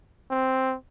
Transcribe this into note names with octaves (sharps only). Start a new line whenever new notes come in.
C4